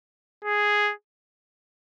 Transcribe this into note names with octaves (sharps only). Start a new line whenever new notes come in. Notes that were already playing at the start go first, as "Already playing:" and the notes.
G#4